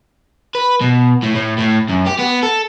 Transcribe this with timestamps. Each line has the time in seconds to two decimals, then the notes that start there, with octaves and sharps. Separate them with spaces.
0.55 B4
0.81 B2
1.23 A2
1.36 A2
1.59 A2
1.90 F#2
2.07 G4
2.19 B3
2.43 A4